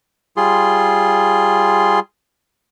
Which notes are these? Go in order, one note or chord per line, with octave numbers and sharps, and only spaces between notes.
G3 F4 G#4 C6